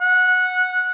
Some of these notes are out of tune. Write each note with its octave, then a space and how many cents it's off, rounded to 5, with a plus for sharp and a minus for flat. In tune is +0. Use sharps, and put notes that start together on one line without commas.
F#5 -15